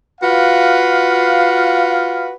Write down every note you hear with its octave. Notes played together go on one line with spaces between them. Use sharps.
F4 F#4 B4 F5